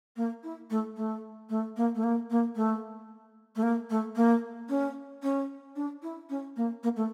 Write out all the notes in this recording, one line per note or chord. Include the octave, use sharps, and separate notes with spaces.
A#3
E4
A3
A3
A3
A#3
A3
A#3
A#3
A3
A3
A#3
A3
A#3
C#4
C#4
D4
E4
C#4
A#3
A#3
A3